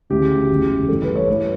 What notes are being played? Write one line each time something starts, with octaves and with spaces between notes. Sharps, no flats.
D2 C#3 E3 G4
F#1 E2 C#3 E3
A1 G2 E3 A4
B4
C#5
A1 G2 E3 B4